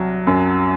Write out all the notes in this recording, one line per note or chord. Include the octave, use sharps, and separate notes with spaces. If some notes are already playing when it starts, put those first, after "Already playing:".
Already playing: C2 F#3
F#2